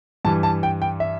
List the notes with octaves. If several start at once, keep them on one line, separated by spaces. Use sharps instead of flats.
G2 E3 G3 A5
A5
G5
G5
E5